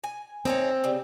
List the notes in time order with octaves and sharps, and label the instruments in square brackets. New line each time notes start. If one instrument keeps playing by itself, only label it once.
[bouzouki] G#5
[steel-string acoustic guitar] C4 [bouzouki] D#4 G#4 C#5
[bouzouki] C#3 G3